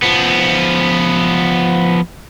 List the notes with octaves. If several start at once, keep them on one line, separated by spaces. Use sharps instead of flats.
F3 B3